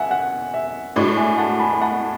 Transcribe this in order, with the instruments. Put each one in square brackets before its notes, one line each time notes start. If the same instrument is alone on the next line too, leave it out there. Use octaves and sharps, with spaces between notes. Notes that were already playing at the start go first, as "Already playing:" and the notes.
Already playing: [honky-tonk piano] C#2 B2 [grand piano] E5 F#5 G#5
[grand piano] F#5
E5
[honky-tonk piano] A2 G#3 D4 F#4
[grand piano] E5 G#5
F#5 A5
G#5 B5
B5
F#5 A5